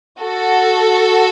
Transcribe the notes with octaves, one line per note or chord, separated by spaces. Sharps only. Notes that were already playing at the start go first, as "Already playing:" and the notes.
F#4 A4